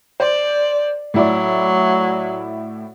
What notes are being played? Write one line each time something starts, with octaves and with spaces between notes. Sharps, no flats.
C5 D5
A2 F#3 E4 D5